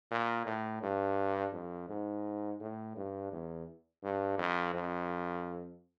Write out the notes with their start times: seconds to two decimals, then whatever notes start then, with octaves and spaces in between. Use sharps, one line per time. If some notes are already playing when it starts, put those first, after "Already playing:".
0.11 A#2
0.46 A2
0.82 G2
1.53 F2
1.89 G#2
2.60 A2
2.96 G2
3.32 E2
4.03 G2
4.38 F2
4.74 F2